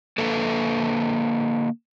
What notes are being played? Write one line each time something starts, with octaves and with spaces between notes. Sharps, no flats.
D3 A#3 A4 B4